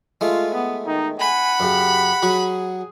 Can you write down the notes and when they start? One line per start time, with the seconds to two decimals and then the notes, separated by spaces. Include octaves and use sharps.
0.21 G#3 A3 F4
0.55 B3
0.87 D#3 D#4
1.20 F#5 G#5 B5
1.60 F#2 C#3 G4
2.22 F#3 F#4 G#4